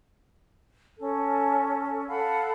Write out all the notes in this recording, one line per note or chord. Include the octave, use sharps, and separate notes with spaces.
C#4 A4
A4 F5 F#5 B5